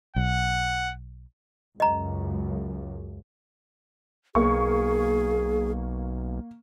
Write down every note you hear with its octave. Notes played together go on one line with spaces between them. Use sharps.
B1 F#5
C#2 F#2 D#5 A#5
B1 A#3 G#4 C#6